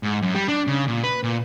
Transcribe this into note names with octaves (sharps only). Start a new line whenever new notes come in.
G#2
F#2
G3
D4
C#3
A#2
B4
A#2